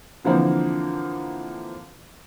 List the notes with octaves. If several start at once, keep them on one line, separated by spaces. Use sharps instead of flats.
D3 E3 F3 A#3 C4